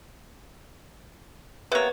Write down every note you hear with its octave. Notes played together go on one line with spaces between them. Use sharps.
C3 A#3 B3 B4 C#5